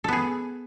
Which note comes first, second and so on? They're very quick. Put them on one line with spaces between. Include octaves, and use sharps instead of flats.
A4 B3 G#4